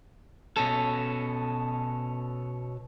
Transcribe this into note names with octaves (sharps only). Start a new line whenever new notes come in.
B2 C#4 A4